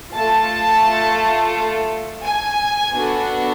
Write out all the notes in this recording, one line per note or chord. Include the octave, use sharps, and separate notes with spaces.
A3 F4 A4 A5
G#5
B3 D4 F#4 A4